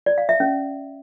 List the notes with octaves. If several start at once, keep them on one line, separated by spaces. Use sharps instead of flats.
D5
F5
E5
C#4